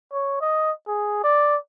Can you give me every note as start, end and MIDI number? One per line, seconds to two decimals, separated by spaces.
0.12 0.41 73
0.41 0.71 75
0.87 1.21 68
1.23 1.56 74